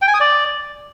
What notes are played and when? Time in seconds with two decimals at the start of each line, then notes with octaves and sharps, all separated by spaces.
0.02 G5
0.08 G#5
0.14 D#6
0.20 D5